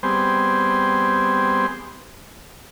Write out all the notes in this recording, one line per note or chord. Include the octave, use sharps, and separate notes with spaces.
G3 B3 C4 G#4 C5